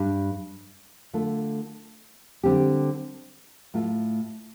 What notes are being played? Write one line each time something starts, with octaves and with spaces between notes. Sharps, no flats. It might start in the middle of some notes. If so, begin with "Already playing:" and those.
Already playing: G2 G3 D4
D3 A3 F4 A4
D3 G3 C4 G4
A2 A3 F4 A4